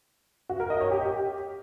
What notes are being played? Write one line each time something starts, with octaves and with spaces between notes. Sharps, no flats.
F#4
A#4
D#5
C#5
G4